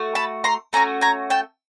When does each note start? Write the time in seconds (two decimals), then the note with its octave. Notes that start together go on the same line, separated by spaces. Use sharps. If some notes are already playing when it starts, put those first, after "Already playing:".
Already playing: A3 F#4
0.15 A5 B5
0.44 A#5 C6
0.73 A3 C#4 F#4 G#5 A#5
1.01 G#5 A#5
1.30 G5 A5